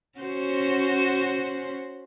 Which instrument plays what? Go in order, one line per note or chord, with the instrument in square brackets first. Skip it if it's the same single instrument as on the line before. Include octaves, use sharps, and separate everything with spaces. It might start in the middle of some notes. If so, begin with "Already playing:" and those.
[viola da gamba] C#4 F#4 C5